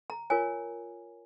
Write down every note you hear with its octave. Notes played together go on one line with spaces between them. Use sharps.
A#5
F4 A#4 C#5 G#5